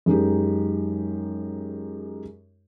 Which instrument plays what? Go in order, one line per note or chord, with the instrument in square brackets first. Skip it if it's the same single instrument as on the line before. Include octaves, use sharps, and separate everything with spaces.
[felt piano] F#2 G#3 D#4 G4